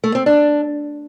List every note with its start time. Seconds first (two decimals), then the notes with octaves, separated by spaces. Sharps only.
0.04 A3
0.15 C4
0.26 D4